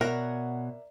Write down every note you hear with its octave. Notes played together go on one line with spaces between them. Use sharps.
B2 A#4 C#5 D5 E5 F#5 F6